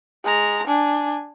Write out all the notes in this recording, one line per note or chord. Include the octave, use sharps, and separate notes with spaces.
G#3 A#5
D4 G#5